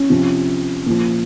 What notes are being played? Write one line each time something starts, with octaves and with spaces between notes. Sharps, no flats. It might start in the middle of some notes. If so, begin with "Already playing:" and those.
Already playing: C#4
C3 F3
A#2 F3